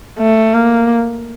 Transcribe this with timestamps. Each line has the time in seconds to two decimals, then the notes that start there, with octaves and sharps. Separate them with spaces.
0.19 A3
0.54 A#3